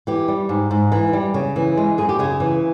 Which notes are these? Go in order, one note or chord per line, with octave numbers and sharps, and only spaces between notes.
E3 G4
G3
G#2
G#2
E3
G3
C#3
E3
G#3
F#2 G#4
G4
C#3 G#4
E3